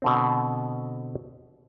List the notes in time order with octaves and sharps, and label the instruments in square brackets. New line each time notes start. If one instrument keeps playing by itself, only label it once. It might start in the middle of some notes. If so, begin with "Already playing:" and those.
[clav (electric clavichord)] B2 D3 C4